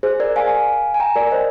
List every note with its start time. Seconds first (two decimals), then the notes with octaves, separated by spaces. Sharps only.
0.03 G#4 C5
0.20 A#4 D5
0.36 F5 G#5
0.94 G#5
1.00 G5 A#5
1.16 A#4 D5
1.31 C5 D#5